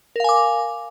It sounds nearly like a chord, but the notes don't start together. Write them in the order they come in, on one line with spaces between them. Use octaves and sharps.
A#4 F5 G#5 D6